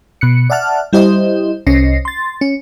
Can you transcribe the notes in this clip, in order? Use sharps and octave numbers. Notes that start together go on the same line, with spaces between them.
B2 F#6 C#7
D5 E5 F#5 A5 F6 F#6
G3 E4 G4 C5 D#5
C2 C#4 D#5 A#6 C7
C6 A6
C#4